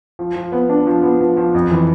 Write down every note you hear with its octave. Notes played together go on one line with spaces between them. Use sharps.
F3
F3
B3
D4
F3
B3
F3
F3
F2
E3